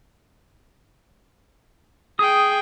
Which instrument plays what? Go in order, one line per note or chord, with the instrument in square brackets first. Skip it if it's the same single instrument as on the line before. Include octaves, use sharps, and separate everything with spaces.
[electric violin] G#4 G5 [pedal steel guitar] D#6